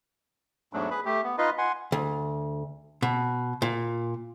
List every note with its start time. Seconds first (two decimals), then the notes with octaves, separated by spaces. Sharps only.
0.73 E2 G#2 F#3 A3 D4
0.91 G#4 B4 B5
1.05 A3 G4
1.23 B3
1.38 D#4 F4 B4 D#5 C6
1.58 F#5 G#5 C6
1.92 D2
3.02 B2
3.62 A#2